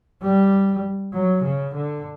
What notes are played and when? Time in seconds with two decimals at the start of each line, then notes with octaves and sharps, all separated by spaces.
0.22 G3
1.14 F#3
1.44 C#3
1.75 D3